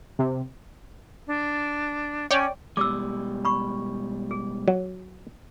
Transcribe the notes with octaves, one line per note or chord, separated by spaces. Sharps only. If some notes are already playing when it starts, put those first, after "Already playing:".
C3
D4
C#4 C#5 D5 G5
B2 G3 G#3 D6 E6
B5 C#6
G#4
F#3